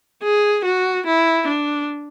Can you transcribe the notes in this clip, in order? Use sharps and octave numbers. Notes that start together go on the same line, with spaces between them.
G#4
F#4
E4
D4